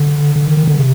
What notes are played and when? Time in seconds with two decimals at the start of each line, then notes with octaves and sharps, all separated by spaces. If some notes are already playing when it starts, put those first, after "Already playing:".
Already playing: D3
0.36 D3
0.46 D#3
0.57 D#3
0.67 D3
0.79 C3